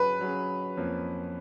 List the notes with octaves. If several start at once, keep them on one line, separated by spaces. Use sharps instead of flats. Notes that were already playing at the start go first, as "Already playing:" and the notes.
Already playing: F#3 C#4 G#4 B4
F#3 C#4 G#4
F2 F3 A#3 C#4